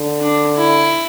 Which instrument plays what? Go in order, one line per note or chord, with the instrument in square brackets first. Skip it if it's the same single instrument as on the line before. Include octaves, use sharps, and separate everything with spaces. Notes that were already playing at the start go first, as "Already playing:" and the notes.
Already playing: [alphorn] D3
[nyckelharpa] D4
E4